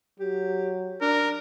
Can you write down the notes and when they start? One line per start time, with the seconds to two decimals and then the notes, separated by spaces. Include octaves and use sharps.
0.20 F#3 G4
1.02 D4 A#4